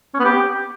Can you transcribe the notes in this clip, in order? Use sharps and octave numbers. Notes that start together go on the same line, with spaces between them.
C#4
B3
G4